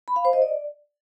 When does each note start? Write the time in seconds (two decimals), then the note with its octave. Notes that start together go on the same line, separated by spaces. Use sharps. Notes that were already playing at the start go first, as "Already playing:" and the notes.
0.08 B5
0.16 F5
0.25 C5
0.33 D#5
0.42 D5